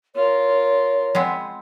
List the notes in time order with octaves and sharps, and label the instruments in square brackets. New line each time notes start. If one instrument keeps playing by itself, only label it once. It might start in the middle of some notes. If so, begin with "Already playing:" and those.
[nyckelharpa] F4 A#4 [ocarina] C#5
[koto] G#3 B3 C4